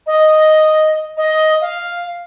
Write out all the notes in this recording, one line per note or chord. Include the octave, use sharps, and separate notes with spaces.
D#5
D#5
F5